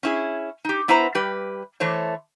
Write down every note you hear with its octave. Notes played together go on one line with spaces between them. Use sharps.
C#4 E4 G#4
D#4 G4
B3 E4 B4 C5 A#5
G3 G4 B4
E3 A3 C5 C#5